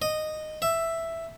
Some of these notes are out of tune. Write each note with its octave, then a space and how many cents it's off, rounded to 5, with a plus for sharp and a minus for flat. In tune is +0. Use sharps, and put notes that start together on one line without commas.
D#5 -10
E5 +5